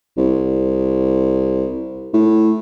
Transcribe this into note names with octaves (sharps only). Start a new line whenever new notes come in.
C2
A2